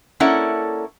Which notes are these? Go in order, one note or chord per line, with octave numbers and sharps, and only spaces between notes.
A#3 C#4 E4 A4 D5 F#5